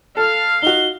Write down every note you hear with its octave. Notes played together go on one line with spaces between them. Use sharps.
A4 F5 F6
D#4 F#4 G7